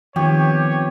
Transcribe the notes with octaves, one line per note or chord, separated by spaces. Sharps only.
D#3 F3 B3 C4 G4 C#5